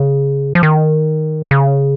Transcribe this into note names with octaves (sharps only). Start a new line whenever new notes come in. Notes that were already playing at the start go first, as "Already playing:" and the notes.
Already playing: C#3
F3
D#3
C#3